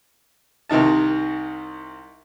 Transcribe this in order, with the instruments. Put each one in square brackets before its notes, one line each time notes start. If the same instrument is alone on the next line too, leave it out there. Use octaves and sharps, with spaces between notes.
[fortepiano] C2 C3 D#3 D#4 A5